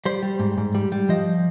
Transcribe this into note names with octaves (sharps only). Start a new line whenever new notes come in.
G3 C5
G3
G#2
G#2
G3
G3
F3 D#5